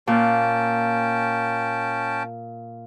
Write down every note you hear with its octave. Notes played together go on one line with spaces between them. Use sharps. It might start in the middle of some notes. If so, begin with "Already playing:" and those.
A#2 C#4 G5 A5